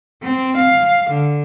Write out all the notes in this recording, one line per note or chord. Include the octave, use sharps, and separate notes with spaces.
C4
F5
D3